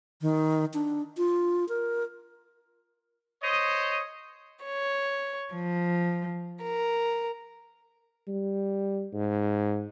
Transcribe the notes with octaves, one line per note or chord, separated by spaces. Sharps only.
D#3
D4
F4
A#4
C5 C#5 D#5
C#5
F3
A#4
G3
G#2